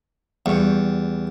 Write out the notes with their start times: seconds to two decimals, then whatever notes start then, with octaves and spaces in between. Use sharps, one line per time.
0.46 E2 G3 C#6